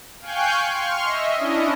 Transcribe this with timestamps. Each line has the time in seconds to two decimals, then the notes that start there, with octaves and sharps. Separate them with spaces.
0.21 F5 G5 G#5 C#6 F#6 G6
0.70 C6 C#6 F6
1.03 D#5 E5
1.37 C#4 D4 E4 D#5